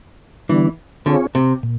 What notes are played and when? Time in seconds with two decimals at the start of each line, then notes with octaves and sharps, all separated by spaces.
0.49 D3 E3 G3 B3 D4
1.06 D3 C4 F4 G#4 C#5
1.35 C3
1.63 A#2